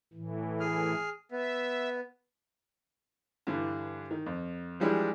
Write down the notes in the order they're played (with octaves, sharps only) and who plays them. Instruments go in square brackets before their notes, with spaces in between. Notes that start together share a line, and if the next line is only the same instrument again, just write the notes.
[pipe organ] A2 E3
[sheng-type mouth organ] G#4 F6
[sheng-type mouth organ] B3 [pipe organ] E5
[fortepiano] G2 D3 E3
D#3
F2
E3 F3 G3 G#3 D4 E4